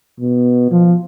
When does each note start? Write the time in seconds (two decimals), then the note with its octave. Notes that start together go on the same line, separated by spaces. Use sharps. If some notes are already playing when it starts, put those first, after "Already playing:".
0.20 B2
0.71 F3